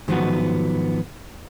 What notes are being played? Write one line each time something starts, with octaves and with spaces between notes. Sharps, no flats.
G#2 D#3 F3 F#3 B3 F#4